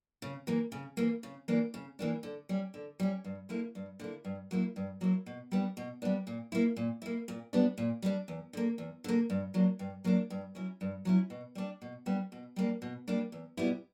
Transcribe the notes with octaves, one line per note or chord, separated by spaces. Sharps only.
C#3
E3 A#3
C#3
E3 A#3
C#3
E3 A#3 D4
C#3
E3 A#3 D4
D3
G3 C#4
D3
G3 C#4
G2
D3 A#3 E4
G2
D3 A#3 E4
G2
F#3 A#3 E4
G2
F#3 A#3 E4
B2
G3 B3 D4
B2
G3 B3 D4
A#2
A#3 E4
A#2
A#3 E4
A#2
G3 B3 D4
A#2
G3 B3 D4
E2
D3 A#3
E2
D3 A#3
G2
F#3 A#3 D4
G2
F#3 A#3 D4
G2
F#3 C#4 E4
G2
F#3 C#4 E4
B2
G3 B3 D4
B2
G3 B3 D4
B2
G3 A#3 D4
B2
G3 A#3 D4
E2
B2 G3 B3 E4